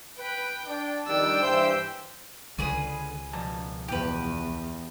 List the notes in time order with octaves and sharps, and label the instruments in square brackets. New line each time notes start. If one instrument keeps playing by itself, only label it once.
[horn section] B4 [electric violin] G5
[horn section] D4
[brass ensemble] F2 D#3 G3 [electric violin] G5 E6
[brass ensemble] G2 E3 [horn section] G4 [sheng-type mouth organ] C5 G6
[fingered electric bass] C#2 [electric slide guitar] D3 [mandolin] C#4 G#4 B4
[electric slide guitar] B2 F3 A5
[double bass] E2 [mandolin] G4 B4